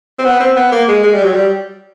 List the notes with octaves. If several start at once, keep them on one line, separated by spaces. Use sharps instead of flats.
C4
B3
C4
B3
A#3
G#3
G#3
G3
F#3
G3